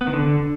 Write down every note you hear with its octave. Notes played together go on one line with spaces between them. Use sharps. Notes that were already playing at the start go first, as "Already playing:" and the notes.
B3
D#3
D3